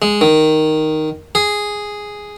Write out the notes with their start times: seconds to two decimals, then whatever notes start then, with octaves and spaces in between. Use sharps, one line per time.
0.02 G#3
0.21 D#3
1.35 G#4